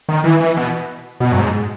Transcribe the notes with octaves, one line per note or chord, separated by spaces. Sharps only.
D#3
E3
E3
B2
B2
F#2
G#2